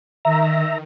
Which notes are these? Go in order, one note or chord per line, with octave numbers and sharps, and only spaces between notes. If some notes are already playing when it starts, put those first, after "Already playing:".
D#3 E5 A#5